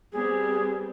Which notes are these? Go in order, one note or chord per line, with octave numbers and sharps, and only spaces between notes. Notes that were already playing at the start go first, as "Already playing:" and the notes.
G3 B3 C4 G#4